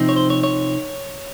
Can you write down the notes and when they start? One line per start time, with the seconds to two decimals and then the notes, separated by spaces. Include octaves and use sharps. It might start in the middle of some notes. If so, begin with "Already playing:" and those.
Already playing: C3 F3 C4 D#4
0.09 C#5
0.16 C5
0.30 C#5
0.43 C#5